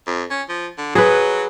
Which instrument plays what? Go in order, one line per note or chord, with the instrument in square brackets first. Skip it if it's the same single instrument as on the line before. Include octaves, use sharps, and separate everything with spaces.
[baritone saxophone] F2
C#4
F3
D3
[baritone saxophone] F#3 [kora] G#4 B4